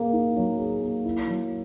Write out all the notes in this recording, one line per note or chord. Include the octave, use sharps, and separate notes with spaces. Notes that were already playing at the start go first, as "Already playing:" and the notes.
Already playing: A#3 G#4
D#4
F#3
G#4
A#3
E4
F#3